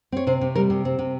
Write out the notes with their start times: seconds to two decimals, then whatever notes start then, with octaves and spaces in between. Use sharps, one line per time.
0.12 C4 C#5
0.27 C3 C5
0.41 C3
0.55 G3 A#4
0.70 C3
0.85 C4
0.99 C3